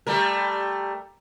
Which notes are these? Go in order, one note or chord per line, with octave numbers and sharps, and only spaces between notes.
G3 A3 A#4